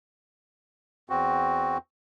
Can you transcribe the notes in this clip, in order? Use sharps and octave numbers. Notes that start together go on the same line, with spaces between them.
E2 C4 F#4